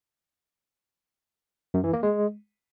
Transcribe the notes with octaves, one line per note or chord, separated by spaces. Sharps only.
F#2
E3
A#3
G#3